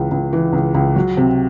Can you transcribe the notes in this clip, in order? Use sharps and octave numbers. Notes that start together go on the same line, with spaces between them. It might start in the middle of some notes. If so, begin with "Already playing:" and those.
Already playing: C#2 E3
C#2
E3
C#2
C#2
F#3
C3